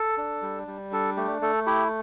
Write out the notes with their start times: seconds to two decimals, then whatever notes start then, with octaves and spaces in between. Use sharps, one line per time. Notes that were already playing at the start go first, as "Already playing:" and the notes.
Already playing: A4
0.17 D4
0.42 G3
0.67 G3
0.92 D4 A4
1.17 A3 G4
1.41 A3 A4
1.66 E4 G4